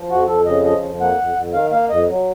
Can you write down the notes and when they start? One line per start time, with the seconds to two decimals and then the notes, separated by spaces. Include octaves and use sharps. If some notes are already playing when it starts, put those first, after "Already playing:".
Already playing: F3
0.10 F2 F#4
0.27 F2 A4
0.46 C#3 D#5
0.63 F3 D#5
0.82 F2
1.00 A#3 F#5
1.18 F2
1.35 F2
1.53 D#3 F5
1.72 A#3 F5
1.89 F2 D#5
2.09 F#3